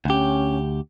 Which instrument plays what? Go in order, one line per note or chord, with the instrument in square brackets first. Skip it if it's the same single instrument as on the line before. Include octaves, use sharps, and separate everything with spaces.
[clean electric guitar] D2 G4 [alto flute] C#4